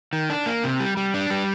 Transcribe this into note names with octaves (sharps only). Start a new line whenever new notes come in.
D#3
D4
A#3
C3
G3
G3
D4
G3